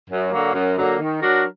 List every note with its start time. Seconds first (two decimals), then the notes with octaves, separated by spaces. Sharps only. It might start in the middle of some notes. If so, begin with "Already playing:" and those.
0.09 F#2
0.32 D3 F#3 A#3
0.53 F#2
0.77 D3 F#3 A#3
1.00 D#3
1.22 F#3 D4 F#4 A#4